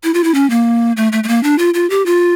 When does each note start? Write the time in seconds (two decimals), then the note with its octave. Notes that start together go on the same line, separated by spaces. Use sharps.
0.04 E4
0.14 F4
0.24 E4
0.34 C#4
0.50 A#3
0.97 A3
1.12 A3
1.24 A3
1.28 A#3
1.43 D4
1.58 F4
1.74 F4
1.90 G4
2.06 F4